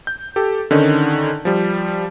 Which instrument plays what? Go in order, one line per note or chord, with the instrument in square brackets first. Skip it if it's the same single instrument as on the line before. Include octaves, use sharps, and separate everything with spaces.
[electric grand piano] G6
G4 A4
D3 D#3 C#4 D#4
F3 G3